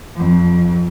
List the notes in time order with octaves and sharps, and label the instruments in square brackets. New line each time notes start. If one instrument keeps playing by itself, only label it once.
[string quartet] F2